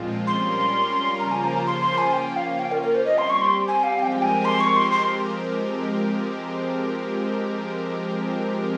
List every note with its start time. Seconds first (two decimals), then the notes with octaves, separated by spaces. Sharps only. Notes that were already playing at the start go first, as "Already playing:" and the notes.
Already playing: A#2 F3 G#3 C4 F4
0.27 G3 C#4 F4 A#4 C6
1.20 C#3 F3 A#3 F4 C5 A#5
1.31 G#5
1.44 A#5
1.67 C6
1.81 C6
1.98 G#5
2.13 A#3 C#4 F4 G5
2.36 F5
2.59 G5
2.72 A#4
2.82 A#4
2.95 C5
3.05 G3 C4 G4 D#5
3.18 C6
3.30 C#6
3.41 C6
3.68 G#5
3.84 F5
3.99 F3 G#3 C4 G4 A#4 G5 G#5
4.22 G#5
4.45 C6
4.60 C#6
4.76 C6
4.92 C6